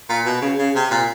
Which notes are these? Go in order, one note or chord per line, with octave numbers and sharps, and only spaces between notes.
A#2
B2
C#3
C#3
C3
A#2